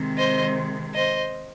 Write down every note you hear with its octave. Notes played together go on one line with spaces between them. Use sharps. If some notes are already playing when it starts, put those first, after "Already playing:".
Already playing: C3 D#3 G#3 C4
C5 D#5
C5 D#5